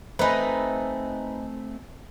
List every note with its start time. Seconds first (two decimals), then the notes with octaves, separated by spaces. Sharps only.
0.19 A3 C4 D#4 B4 C5 D#5 G#5